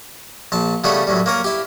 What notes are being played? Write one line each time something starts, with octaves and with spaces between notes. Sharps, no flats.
A#1 A5
C#3 G3 A3 B3 B4
F#2 A2 G3
A#3 C#4 A#4
E4 G4